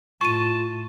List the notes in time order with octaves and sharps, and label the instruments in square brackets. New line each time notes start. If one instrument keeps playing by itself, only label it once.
[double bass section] A2 [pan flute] F4 [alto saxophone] A5 [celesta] C#6 D#7